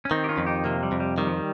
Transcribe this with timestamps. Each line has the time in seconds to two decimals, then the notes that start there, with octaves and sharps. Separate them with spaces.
0.05 C#4
0.11 D#3 C4 D#4
0.24 G4
0.29 C#4 F4
0.38 F2
0.46 D#4 G4
0.64 C3 A#3
0.83 G3
0.92 F2
1.00 G3
1.18 D#3 G3
1.27 F3
1.37 G3